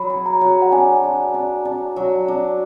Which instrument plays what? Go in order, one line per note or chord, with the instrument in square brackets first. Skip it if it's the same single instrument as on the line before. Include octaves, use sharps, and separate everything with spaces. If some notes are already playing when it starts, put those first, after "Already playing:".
Already playing: [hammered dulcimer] F#3 [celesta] B5
[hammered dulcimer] G#4
[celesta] A#5
[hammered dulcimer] F#3
[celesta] F#5
[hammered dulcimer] D4 [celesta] G#5
[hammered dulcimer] D4
D4
D4
F#3
D4